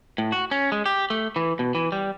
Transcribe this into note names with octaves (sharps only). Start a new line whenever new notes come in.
A2
F#4
C#4
G#3
G4
A3
E3
B2
E3
G3